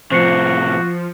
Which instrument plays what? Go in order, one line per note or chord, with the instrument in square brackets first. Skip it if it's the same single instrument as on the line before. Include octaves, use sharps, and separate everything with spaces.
[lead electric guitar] A2 C3 [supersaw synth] F3 [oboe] F#4 [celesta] C5 C7 C#7